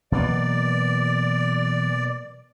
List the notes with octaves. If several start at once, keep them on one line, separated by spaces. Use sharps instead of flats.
B2 E3 F#3 A#3 D5